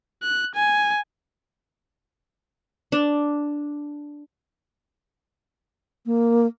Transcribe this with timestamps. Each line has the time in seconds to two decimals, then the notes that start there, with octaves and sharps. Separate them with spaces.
0.23 F#6
0.55 G#5
2.92 D4
6.06 A#3